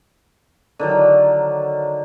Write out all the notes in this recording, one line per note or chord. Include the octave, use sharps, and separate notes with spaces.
D3 D#3 F#3